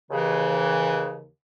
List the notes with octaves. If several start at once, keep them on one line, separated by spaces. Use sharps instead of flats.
D#2 C#3 E3